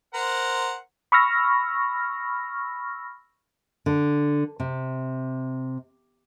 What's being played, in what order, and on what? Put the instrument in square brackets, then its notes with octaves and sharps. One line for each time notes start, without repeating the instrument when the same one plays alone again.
[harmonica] A#4 C5 F#5
[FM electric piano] B5 C#6 E6 F6 A#6
[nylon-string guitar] D3
C3